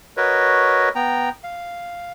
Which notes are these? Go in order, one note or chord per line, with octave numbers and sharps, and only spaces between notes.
F#4 A#4 B4 C#5 D#5
B3 G5 A#5
F5